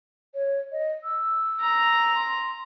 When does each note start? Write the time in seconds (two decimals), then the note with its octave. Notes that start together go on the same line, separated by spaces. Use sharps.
0.34 C#5
0.72 D#5
1.03 E6
1.61 A#5
2.16 C6